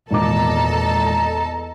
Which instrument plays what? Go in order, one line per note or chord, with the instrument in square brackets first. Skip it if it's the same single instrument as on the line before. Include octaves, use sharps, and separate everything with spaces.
[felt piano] G#1 A#2 D6 [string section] E2 A4 A5 [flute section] D#5 A#5